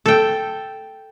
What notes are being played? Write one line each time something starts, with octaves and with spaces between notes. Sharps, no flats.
A4 G5